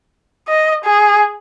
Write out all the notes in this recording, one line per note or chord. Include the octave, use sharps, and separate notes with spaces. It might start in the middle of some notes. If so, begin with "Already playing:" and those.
D#5
G#4